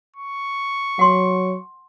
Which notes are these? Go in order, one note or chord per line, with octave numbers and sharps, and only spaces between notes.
C#6
F#3 F#5 C6